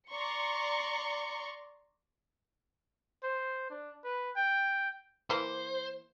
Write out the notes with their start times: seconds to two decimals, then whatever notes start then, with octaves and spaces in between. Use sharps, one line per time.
0.10 D5 A#5 C6 C#6 C#7
3.23 C5
3.70 D4
4.04 B4
4.36 G5
5.30 E3 A#3 C5